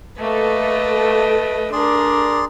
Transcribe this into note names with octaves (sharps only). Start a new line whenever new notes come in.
A3 A#3 B4 D#5
D4 G#4 A#4 D5 C6